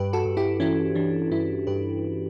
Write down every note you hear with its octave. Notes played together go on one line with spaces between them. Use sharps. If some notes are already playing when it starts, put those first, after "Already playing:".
Already playing: G2 G4 B4
F#4 A4
G2
E4 G4
E3 C#4 E4
E3 D4
G2 C#4 E4
G2 G4 B4